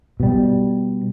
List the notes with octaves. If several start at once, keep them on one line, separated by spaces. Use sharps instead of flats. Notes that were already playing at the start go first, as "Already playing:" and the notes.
B2 G3